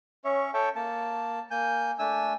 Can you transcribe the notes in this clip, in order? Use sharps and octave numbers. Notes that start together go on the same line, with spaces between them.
C#4 C#5 E5
A4 C#5 E5 G5 A5
A#3 A5
A#3 G#5 G6
A3 D4 G#5 E6